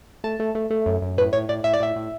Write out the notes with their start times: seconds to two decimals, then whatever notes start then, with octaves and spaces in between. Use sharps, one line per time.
0.24 A3 A5
0.40 A3
0.55 A3
0.70 A3
0.86 F#2
1.02 F#2
1.18 A2 B4
1.33 A2 C#5
1.49 A2 D5
1.64 A2 E5
1.73 D5
1.80 A2 E5
1.96 A2